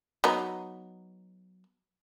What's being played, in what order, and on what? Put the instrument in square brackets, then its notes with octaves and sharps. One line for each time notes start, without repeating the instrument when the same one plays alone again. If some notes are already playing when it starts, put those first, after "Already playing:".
[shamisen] F#3 B3 D#4